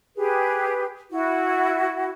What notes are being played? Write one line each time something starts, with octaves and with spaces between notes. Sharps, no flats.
G4 G#4 B4
E4 F#4